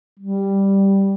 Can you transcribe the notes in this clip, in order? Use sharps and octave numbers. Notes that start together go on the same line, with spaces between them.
G3